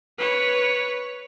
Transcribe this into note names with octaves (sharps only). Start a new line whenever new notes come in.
B4 C#5